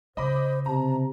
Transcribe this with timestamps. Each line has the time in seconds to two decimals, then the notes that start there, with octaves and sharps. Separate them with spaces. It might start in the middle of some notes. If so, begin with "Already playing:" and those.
0.17 C#3 C5 D#5 B5 D6
0.66 C3 A5 A#5